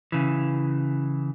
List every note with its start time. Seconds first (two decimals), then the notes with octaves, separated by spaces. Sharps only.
0.12 C#3 E3